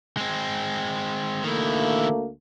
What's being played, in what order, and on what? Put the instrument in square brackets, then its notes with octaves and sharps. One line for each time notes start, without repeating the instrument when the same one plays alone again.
[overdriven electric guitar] G#3 C4
[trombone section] D2 A3 A#3 [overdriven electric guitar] D#3 E4